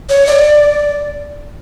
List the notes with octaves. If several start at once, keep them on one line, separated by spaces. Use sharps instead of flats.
C#5
D5